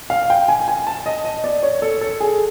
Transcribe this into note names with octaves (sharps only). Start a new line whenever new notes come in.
F5
G5
G#5
G#5
A5
D#5
D#5
D5
C#5
A4
A4
G#4